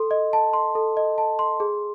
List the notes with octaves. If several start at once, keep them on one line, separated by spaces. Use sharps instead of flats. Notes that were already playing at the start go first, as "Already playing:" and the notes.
Already playing: A4 C6
D#5
A5
C6
A4
D#5
A5
C6
G#4